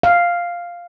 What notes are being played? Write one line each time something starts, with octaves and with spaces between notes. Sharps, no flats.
F5